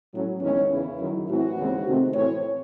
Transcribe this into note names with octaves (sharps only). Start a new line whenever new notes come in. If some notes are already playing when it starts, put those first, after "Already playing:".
A2 F#3 C#4
E2 D#3 G#3 C#4
E2 C#3 E3 E4
F#2 D#3 F#3
A2 E3 A3 C4 F#4
D#2 C#3 E3 G#3 C4
C3 D#3 A3 C4
A2 E3 C4 C#5